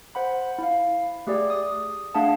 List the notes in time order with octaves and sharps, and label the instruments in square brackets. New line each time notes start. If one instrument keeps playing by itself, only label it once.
[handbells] C5 F#5 B5
E4 F5
A3 G4 G#4 D5
D#6
A3 D4 G#4 F5 F#5 A5